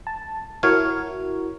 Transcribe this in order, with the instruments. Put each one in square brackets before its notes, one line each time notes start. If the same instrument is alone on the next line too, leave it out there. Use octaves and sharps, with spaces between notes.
[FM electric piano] A5
[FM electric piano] E4 F#4 A#4 [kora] C#5 [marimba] F6